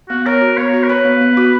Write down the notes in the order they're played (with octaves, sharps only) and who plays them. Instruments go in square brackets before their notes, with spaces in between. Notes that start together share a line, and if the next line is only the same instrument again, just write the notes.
[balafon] B3 [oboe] F#4
[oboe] A#4 [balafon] C#5
[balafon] F#4
[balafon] B3 [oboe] C#5
[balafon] F#4
[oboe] A#4
[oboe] B4 [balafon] C#5
[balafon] B3
B3
F#4